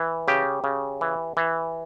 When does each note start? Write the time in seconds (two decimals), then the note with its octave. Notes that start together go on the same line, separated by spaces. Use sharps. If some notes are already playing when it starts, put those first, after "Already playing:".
Already playing: E3
0.28 C#3 G4
0.64 C#3
1.01 E3
1.37 E3